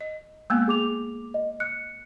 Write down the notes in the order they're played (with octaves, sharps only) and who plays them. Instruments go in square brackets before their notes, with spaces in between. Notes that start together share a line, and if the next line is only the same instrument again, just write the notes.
[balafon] D#5
[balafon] G#3 A#3 B3 [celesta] E6
[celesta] G#4 D6 F7
D#5
F#6 C#7